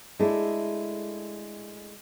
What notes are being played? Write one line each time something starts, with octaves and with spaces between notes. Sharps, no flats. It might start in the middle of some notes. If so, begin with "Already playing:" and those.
G#3 A3 D4 E4